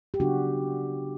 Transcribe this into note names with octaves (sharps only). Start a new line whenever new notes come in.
G4
C#3 F#3 B3 D4 F#4